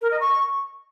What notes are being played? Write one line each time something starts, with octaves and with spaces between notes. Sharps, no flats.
A#4
D#5
C#6